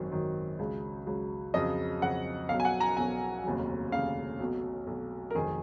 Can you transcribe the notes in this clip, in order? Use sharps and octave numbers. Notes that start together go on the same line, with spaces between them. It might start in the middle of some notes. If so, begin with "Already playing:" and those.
Already playing: G#1 F#2 D#3 F#3
G#1 F#2 D#3 F#3
C#2 C#3 F#3
C#2 C#3 F#3
F2 C#3 F#3 D#5
F2 C#3 F#3 F#5
B1 B2 F#3 F5
G#5
F#5
A#5
B1 B2 F#3 G#5
F1 D#2 C#3 F#3
F1 D#2 C#3 F#3 F5
B1 B2 F#3
B1 B2 F#3
A#4
F1 F2 D#3 F#3 G#4